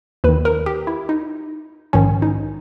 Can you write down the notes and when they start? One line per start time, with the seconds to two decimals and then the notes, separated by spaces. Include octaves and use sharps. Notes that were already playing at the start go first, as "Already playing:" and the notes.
0.24 D#2 D#3 B4
0.45 A#4
0.66 G4
0.87 E4
1.09 D#4
1.93 A#1 G#2 D#3 C#4
2.22 D#4